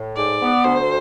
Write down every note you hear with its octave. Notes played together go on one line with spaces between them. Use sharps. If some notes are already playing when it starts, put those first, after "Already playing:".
Already playing: A2
G#2 D5
B3
D2 C5